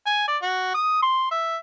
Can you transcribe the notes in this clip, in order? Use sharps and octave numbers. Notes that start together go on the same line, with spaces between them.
G#5
D5
F#4
D#6
C6
E5